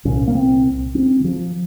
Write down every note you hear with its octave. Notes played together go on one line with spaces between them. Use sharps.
C2 A#2 C#4
A#3
C4
C4
D#3
F3